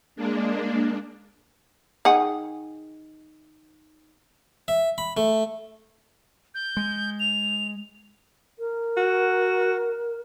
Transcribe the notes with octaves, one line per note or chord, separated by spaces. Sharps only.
G#3 A#3 D4
D#3 G#4 F#5
E5
B5
A3
G6
G#3
F7
A#4
F#4